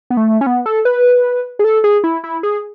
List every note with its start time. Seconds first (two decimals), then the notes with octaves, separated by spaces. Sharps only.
0.10 B3
0.17 A3
0.41 C#4
0.47 B3
0.66 A4
0.85 B4
1.59 G#4
1.64 A4
1.84 G#4
2.04 E4
2.24 E4
2.43 G#4